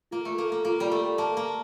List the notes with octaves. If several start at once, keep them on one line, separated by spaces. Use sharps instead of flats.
A#3 F4
A3
A#3 A4
A#3
A#3 F4
G3
A3 A4
A#3 A5
A#3
A5